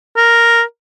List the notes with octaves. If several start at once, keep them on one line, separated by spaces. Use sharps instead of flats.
A#4